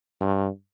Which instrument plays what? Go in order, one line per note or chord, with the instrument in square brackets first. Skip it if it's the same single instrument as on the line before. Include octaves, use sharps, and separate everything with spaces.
[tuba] G2